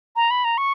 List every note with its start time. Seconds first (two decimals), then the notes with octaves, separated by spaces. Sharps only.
0.16 A#5
0.31 B5
0.45 A#5
0.58 C#6